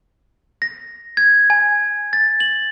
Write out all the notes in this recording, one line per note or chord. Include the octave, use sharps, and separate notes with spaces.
A#6
G#6
G#5
A6
F#7